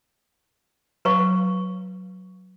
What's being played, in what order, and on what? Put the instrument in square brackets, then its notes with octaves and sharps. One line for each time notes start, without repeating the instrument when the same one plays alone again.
[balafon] F#3 [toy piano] B4 F5 C#6